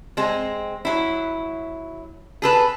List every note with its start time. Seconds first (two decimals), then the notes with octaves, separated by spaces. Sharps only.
0.17 G#3 C4
0.85 F#3 E4
2.42 G#4 A4 B4